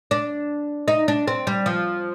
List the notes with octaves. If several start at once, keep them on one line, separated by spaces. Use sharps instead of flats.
D4
D#4
D4
C4
G3
F3